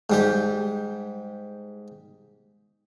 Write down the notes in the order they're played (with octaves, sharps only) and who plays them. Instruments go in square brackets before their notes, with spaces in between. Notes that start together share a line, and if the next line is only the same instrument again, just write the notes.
[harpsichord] G#2 G3 G4